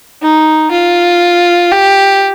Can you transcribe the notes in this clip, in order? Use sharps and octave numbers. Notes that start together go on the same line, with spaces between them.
D#4
F4
G4